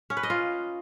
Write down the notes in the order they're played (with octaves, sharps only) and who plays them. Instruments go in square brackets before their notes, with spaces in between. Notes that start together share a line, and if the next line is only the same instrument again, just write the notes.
[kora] C#4
B4
D#5
F4